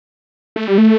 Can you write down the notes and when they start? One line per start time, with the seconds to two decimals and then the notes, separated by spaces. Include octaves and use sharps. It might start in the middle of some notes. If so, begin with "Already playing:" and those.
0.56 A3
0.68 G3
0.78 A3